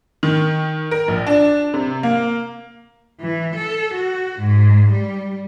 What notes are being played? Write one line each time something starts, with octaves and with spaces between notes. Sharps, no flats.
D#3
A#4
A#1
D4
C3
A#3
E3
A4
F#4
G#2
G3